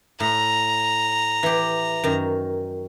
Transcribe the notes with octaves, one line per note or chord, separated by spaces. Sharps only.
A2 A#5
E3 G4
F#2 D#3